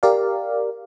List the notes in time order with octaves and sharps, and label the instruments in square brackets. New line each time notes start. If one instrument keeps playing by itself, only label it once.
[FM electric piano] G4 A#4 D5 F5